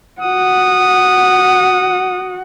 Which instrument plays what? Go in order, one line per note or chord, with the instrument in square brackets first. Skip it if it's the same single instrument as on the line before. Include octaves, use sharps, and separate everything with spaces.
[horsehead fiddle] F#4 F#5 [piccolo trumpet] D#6